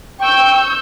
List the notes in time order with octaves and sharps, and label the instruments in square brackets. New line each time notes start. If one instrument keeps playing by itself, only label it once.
[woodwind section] G5 [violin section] C#6 E6 G6